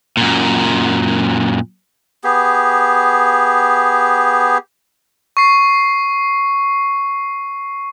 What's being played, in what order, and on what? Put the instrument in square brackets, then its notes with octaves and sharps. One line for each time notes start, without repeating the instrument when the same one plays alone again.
[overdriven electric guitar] F#2 A#2
[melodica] B3 G4 G#4
[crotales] C#6 C7